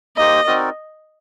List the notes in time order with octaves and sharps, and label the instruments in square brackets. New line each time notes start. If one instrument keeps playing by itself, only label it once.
[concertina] A#3 D#4 G4 C5 [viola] D#5
[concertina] C4 D#4 F#4 A#4 D5